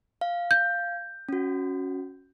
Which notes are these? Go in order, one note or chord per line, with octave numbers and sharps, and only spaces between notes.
F5
G6
C#4 F#4